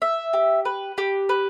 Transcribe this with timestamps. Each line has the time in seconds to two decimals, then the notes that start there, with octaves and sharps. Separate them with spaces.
0.02 E5
0.33 G4
0.65 B4
0.98 G4
1.29 B4